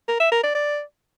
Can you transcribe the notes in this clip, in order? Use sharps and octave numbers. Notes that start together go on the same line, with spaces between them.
A#4
E5
A#4
D5
D5